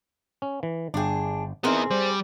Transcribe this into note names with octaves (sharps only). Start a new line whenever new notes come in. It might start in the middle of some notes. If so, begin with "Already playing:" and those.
C#4
E3
G1 D4 G#4 G5
B3 C4 D#4 E4 G#4 A#4
G3 C5